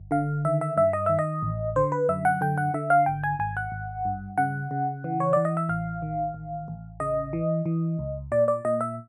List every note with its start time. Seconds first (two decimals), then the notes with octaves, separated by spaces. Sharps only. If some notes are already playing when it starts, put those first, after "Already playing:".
Already playing: G1
0.11 D3 F5
0.45 D#3 E5
0.61 E5
0.77 G2 E5
0.93 D#5
1.06 D#3 E5
1.19 D#5
1.43 A1
1.76 D3 C5
1.92 B4
2.09 F#2 E5
2.25 F#5
2.41 D3 G5
2.58 F#5
2.74 D3 E5
2.90 F5
3.06 G#1 G5
3.24 G#5
3.39 G#1 G#5
3.57 F#5
3.72 G#1
4.05 G2
4.38 C#3 F#5
4.71 C#3
5.04 E3
5.20 C#5
5.33 E3 D5
5.45 D#5
5.57 E5
5.69 A1 F5
6.02 D#3
6.34 A1
6.68 A1
7.00 C#3 D#5
7.33 E3
7.66 E3
7.99 C#2
8.32 A#2 D5
8.48 D5
8.65 A#2 D#5
8.81 E5